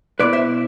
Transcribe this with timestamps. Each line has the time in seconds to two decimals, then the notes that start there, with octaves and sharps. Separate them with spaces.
0.20 B2 B3 E4 B4 D5
0.33 C5 E5